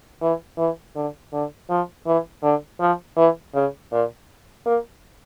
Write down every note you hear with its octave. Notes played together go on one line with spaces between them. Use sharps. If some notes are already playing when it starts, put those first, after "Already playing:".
E3
E3
D3
D3
F3
E3
D3
F3
E3
C#3
A#2
A#3